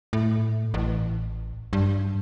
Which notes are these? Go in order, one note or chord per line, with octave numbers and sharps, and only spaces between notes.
A2
A1
G2